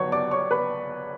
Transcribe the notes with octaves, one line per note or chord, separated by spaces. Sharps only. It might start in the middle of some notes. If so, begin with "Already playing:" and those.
Already playing: G1 G2 F#3 B3 C#5 C#6
D5 D6
C#5 C#6
B4 B5